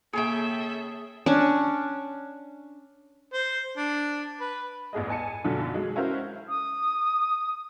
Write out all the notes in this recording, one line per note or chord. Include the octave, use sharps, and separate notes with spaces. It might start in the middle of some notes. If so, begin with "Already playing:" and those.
C#3 A#3 G#4 A4 C#5 E5 G5
C#4 D4
C5
D4
B4
A1 E2 G#4 D#5
G#5 A5 C#7
B1 F#2 D3 F3
F#3 G#3 D#4
C#4 E4 F#4 A#4 C5 F5
D#6